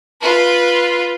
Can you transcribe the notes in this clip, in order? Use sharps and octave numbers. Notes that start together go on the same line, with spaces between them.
F4 B4